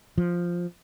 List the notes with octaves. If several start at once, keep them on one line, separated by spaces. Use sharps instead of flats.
F3